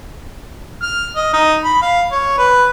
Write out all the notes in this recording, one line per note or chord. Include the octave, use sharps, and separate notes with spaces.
F6
D#5
D#4
B5
F5
C#5
B4